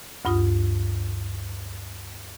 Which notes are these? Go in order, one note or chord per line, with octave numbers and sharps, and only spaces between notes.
D2 G2 F4 D#6